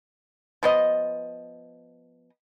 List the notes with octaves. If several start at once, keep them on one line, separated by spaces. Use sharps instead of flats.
F3 B3 D#5